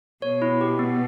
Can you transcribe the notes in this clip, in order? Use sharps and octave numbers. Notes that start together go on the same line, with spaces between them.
B2 C#5
E4
G4
B3